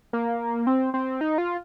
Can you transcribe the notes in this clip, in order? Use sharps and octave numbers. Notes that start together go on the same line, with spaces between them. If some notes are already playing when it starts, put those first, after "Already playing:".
A#3
C4
C4
D#4
F4